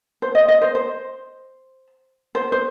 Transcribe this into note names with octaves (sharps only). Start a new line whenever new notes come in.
C5
D#5
D#5
C5
C5
C5
C5